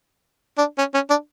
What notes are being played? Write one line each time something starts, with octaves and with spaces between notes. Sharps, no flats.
D4
C#4
C#4
D4